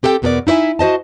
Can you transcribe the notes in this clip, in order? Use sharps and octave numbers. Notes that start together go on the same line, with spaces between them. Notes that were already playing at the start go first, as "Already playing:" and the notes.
C4 G4 A4 F5 G5
E2 B2 B3 A4 A#4 D5
D#4 E4 C#5 E5 G#5
F#4 C5 D#5 A5